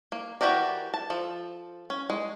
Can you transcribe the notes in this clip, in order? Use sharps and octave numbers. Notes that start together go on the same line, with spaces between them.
A#3
E3 F#4 G4 A#4 D5
A5
F3 A4
C#4
G#3